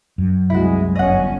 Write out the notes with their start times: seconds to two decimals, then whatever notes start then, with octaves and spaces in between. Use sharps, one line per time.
0.18 F#2
0.50 C2 G#3 E4 F#4
0.95 G1 C#4 D#5 F#5